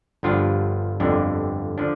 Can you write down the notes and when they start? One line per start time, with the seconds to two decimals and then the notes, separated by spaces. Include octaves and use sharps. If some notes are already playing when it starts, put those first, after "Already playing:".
0.23 G1 G2 F3 D4 F4
1.00 G1 F2 D3 F3 D4
1.78 D3 F3 D4